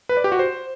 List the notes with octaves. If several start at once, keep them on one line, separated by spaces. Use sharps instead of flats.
B4
D5
G4
F#4
C5